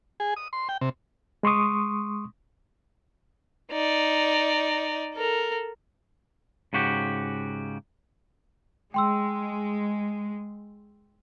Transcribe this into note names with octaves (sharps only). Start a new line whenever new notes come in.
G#4
D#6
C6
G5
C3
G#3 C6 C#6 D#6
D#4 D5
A4 A#4
G#2 C#3 F#4 G4
G#3 G5 C6 E6